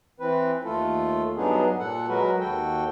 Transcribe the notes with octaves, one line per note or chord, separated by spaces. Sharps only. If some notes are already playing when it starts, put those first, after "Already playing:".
E3 C4 B4
D#2 A3 F4 A4
G2 F#3 B3 D4 D#4 G#4
A#2 A4 F#5
F#3 G#3 F#4 A#4 B4
D#2 F#4 A4 G5